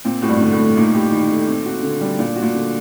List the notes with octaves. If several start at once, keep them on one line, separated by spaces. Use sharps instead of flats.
A#2 C4
A2 F#4
G2
G2 D3
A2
A3
A#2 D#4
G4
D#3
A3
C4
F#4
D3
G3
A#2 D4
F#4
A#2
D3